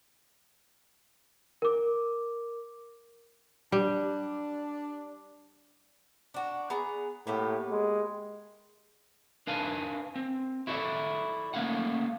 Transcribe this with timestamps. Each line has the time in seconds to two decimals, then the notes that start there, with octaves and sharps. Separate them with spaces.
1.62 A#4 D6
3.72 G3 D4
6.34 D4 F#4
6.70 B3 G#4 A#5
7.27 A2 A#3 B3 G4
7.71 G#3
9.47 D4 A#4 B4 F5 G#5 A5
10.16 C4
10.67 E4 F#4 A4 B4 D5 E5
11.54 A3 A#3 C#4 F5 F#5